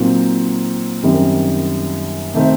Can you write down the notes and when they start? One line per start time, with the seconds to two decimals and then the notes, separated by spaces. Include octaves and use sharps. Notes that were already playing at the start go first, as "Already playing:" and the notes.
Already playing: A#2 F#3 C4 D#4
1.03 F#2 D#3 G3 C4
2.33 C3 D#3 A3 C4 D#4